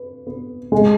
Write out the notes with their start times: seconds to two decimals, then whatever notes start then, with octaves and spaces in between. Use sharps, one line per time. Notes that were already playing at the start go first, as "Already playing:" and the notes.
Already playing: B4
0.27 B3
0.72 G#3